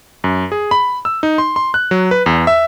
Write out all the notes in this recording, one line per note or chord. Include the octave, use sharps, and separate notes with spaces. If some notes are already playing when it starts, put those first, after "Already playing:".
F#2
G#4
B5
E6
D#4
C6
C6
F#6
F#3
B4
E2
E5